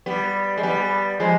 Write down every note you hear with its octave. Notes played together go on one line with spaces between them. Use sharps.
G3 B3
G#3
G3 B3
F3 G#3